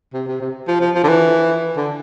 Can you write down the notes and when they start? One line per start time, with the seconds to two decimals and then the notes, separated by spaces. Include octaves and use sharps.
0.13 C3
0.27 C3
0.41 C3
0.68 F3
0.81 F3
0.95 F3
1.04 D3
1.08 E3
1.76 D3